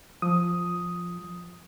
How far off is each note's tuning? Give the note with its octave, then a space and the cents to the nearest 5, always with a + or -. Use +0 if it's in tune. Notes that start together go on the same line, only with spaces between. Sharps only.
F3 +0 D#6 +5